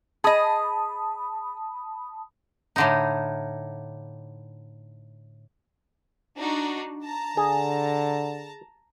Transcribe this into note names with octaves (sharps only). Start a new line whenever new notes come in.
G#4 D#5 A5 B5 D#6
A2 D3 D#4
D4 D#4 F#4
A5 A#5
D3 G#4